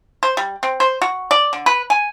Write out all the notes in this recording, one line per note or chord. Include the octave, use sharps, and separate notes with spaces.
C5
G3
C4
C5
F#4
D5
D3
B4
G#5